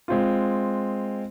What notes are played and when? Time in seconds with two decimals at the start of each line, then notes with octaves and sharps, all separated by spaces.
0.08 G#3 C4 F4